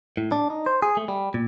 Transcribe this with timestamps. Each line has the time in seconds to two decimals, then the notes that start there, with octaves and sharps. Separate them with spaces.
0.17 A2
0.32 D4
0.50 D#4
0.66 C5
0.82 G#4
0.97 A3
1.08 G3
1.34 A#2